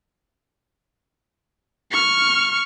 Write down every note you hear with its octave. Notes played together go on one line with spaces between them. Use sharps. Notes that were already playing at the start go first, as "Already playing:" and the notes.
C#6 F6